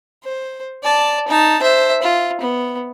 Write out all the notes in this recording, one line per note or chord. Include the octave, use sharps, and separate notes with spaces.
C5
D5 A5
D#4 A5
C5 E5
F4
B3